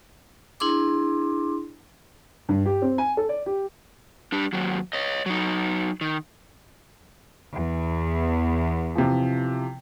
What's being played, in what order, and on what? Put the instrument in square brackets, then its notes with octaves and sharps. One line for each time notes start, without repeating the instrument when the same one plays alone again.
[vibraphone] D4 E4 G#4 C6 D6
[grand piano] G2
G4
C4
G#5
A4
D5
G4
[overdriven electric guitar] G3 D4
D#2 F#3
C#5 D#5
F#3 D#4
D#3
[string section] E2
[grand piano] C3 E3 F3